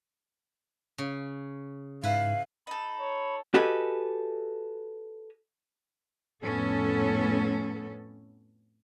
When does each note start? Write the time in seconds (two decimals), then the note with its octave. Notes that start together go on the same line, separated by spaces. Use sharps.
0.98 C#3
2.04 G#2 E4 B4 F5
2.67 D#4 A4 B5
3.00 C#5
3.54 F#4 G4 A4 B4 D#5 G#5
6.43 F2 A2 B3 C#4 A4